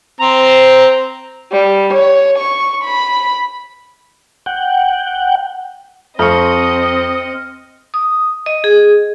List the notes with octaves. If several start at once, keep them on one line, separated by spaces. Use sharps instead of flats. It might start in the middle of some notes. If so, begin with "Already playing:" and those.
C4 C5 A#5
G3
C#5
C#6
B5
F#5 G5
F2 C4 D#5 C#6 D#6 F6 C#7
D#6
D#5
G#4